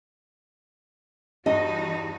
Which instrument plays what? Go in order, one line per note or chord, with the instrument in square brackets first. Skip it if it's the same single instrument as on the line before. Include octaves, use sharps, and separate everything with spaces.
[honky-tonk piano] E2 G2 [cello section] E3 D#4 F#4 [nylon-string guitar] D#5